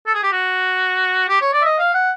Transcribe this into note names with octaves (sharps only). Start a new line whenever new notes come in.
A4
G#4
G4
F#4
G4
C#5
D5
E5
D#5
F5
F#5